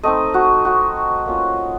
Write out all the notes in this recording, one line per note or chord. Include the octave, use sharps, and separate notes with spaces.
A3 C4 D#4 D#5
F#4
F#4
A#3 C#4 F4